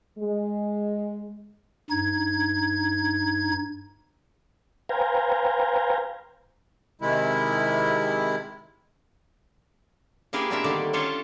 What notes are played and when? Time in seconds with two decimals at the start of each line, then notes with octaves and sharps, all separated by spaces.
0.19 G#3
1.90 G2 D#4 G#6
4.89 B4 C5 F5 G5 G#5 A#5
7.01 C3 D#3 G#3 E4
10.33 A#3 E4 G4 G#4 B4 F#5
10.50 B2 C4 D4 E4 A#4 E5
10.64 D3 D#3 G3 A3 A#3 D4
10.93 C#4 D4 F4 A4 C5 C#5